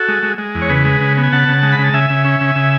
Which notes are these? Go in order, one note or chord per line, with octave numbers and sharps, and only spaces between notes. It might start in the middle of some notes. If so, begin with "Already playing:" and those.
Already playing: F#4 A4
G#3
G#3
G#3
E2
C#5
C#3 G#4 B4
G#3
C#3
B3
G#5
C#3 F#5 A5
C#3
G#3
B5
C#3
A5
C#3 E5 G#5
C#3
C#4
C#3
C#3